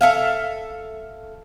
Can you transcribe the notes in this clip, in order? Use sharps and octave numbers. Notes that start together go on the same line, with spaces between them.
A4 E5 F5